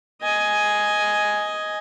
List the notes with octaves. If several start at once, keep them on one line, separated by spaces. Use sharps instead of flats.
D#5 G#5